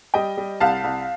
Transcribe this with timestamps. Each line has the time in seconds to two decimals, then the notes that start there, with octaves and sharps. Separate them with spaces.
0.14 G3 D#5 G5
0.37 G3
0.60 C2 F5 A5
0.84 C2